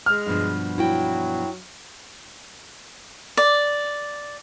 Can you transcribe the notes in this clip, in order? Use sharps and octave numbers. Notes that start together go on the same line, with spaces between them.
G#3 F6
G2 B2 F3
F#3 E4 F#4 G5
D5